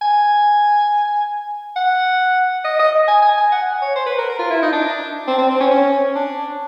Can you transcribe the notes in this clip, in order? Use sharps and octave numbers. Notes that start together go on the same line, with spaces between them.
G#5
F#5
D#5
D#5
G#5
G#5
G#5
F#5
C#5
C5
B4
A#4
A#4
F4
E4
D#4
D4
C4
C4
C4
C#4
C#4
D4